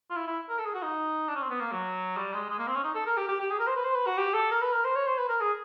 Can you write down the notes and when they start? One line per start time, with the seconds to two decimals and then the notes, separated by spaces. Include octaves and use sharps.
0.10 F4
0.16 E4
0.27 E4
0.49 A#4
0.58 A4
0.66 G#4
0.74 F#4
0.83 D#4
1.29 D4
1.35 C#4
1.42 C4
1.50 B3
1.60 A#3
1.72 F#3
2.17 G3
2.33 G#3
2.50 G#3
2.59 A#3
2.67 C4
2.76 C#4
2.84 D#4
2.95 A4
3.06 A#4
3.17 G4
3.28 G4
3.40 G4
3.51 G#4
3.60 A#4
3.67 C5
3.76 B4
3.84 C5
3.95 B4
4.07 F#4
4.17 G4
4.34 A4
4.51 A#4
4.62 B4
4.73 A#4
4.85 C5
4.95 C#5
5.07 C5
5.18 B4
5.29 A#4
5.40 G#4